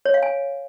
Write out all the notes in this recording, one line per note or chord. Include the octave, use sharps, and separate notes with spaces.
C#5
F5
G#5